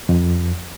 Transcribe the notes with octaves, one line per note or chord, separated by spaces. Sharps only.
F2